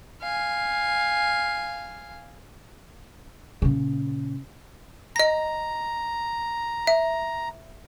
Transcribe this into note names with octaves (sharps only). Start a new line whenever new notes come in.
F5 G#5
A#2 C#3
D#5 A#5 A#6
E5